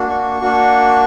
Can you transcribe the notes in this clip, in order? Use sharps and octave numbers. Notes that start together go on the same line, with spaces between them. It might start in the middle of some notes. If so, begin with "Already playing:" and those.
Already playing: A#3 D4 F#4
C#6
A#3 D4 F#4